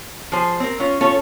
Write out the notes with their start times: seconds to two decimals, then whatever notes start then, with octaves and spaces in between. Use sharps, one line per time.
0.32 F3 G#4 C5
0.60 C4 A#4
0.80 C#4 F4
1.01 C#4 F4 A4 C#5